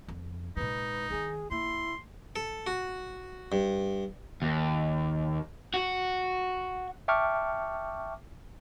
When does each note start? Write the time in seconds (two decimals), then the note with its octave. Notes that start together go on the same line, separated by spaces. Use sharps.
0.08 F2
0.57 A#2 G#3 D#4 B4
1.10 D3 D#3 G#4
1.51 A#3 E4 C6
2.36 A4
2.67 F#4
3.52 G2
4.42 D#2
5.74 F#4
7.08 E5 G5 A5 C#6 D6 F6